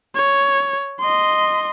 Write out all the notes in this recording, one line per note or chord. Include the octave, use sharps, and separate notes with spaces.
C#5
D#5 C6